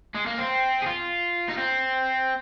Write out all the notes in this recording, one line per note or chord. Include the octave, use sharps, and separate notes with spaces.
G#3
A#3
C4
G#4
F4
D#4
C4